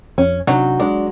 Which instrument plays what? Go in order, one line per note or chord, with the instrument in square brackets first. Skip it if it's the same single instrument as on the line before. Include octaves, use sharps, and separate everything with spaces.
[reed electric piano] F2 [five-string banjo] C#4
[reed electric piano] C3 D4 F#5 [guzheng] F#3 [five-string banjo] D#4
[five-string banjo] G#3 [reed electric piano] D4 D5